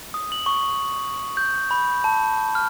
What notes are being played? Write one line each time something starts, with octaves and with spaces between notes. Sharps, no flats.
D#6
F#7
C#6
G6
B5
A5
F6